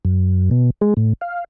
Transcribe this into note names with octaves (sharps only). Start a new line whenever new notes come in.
F#2
B2
G#3
A2
F5